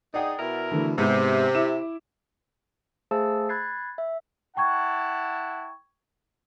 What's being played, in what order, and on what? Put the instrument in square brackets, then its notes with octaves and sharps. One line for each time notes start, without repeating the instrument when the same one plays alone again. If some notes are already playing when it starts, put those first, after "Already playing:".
[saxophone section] D#4 G#4 [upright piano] D5 F#5 G5
[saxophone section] B2 E4 A#4
[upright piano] D3 E3 A3
[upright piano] G#2 B3 [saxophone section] C3
[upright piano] E4 D6 E7
[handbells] A3 G#4 C5 F5 A5 E6
B5 F#6 G#6 A6 C7
E5
[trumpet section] E4 F#5 A5 [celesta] G5 C#6 G#6